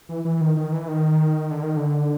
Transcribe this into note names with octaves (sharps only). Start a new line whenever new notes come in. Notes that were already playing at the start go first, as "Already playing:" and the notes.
E3
E3
D#3
D#3
E3
D#3
D3
D#3
D3